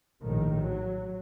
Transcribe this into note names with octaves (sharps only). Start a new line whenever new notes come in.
A#1 A2 D#3
F#3